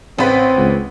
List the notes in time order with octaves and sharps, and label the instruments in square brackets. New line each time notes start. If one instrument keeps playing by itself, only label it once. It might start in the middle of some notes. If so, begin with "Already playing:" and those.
[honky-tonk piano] A1 B4 B6 [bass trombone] C4
[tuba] C#2